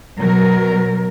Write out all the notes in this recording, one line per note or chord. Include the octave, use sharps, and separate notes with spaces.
B2 F#3 A#4